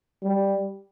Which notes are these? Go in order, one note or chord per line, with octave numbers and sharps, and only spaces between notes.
G3